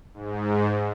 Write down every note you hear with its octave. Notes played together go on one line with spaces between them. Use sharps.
G#2